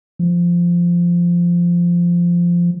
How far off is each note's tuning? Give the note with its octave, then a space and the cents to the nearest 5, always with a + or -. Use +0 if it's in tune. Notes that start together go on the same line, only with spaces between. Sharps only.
F3 -10